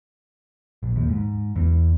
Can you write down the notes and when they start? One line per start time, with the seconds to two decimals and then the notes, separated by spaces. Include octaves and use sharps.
0.83 A#1
0.96 D#2
1.09 G#2
1.56 E2